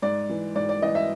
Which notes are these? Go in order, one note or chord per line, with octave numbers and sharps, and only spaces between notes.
G#2 D5
E3
G#2 D5
D5
E3 D#5
E5